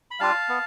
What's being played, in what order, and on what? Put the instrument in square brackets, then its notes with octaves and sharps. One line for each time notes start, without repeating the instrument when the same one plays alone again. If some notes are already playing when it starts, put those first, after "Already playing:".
[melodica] B5
G3 D4 F4 F5 A5
B3